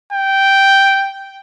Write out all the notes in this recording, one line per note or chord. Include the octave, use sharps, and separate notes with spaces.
G5